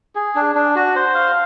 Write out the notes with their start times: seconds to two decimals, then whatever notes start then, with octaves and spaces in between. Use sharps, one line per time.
0.15 G#4
0.35 D4
0.55 D4
0.75 F#4
0.96 C5
1.14 F5